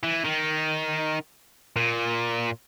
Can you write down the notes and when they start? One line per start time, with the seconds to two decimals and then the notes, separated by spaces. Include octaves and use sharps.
0.03 E3
0.25 D#3
1.76 A#2